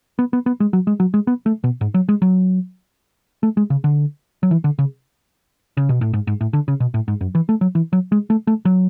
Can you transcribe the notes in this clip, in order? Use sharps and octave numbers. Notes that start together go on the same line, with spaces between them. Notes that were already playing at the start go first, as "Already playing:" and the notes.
B3
B3
B3
G#3
F#3
G#3
F#3
G#3
B3
A3
B2
G#2
F#3
G#3
F#3
A3
G#3
C#3
D3
F#3
E3
D3
C#3
C#3
B2
A2
G#2
G#2
A2
D3
C#3
B2
A2
G#2
F#2
E3
A3
F#3
E3
F#3
G#3
A3
A3
F#3